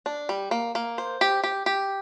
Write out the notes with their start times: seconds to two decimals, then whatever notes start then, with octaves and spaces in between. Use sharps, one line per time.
0.06 D4
0.29 G3
0.51 A#3
0.75 A#3
0.98 C5
1.21 G4
1.44 G4
1.66 G4